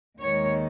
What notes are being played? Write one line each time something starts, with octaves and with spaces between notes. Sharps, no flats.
D#2 D#3 G#3 C#5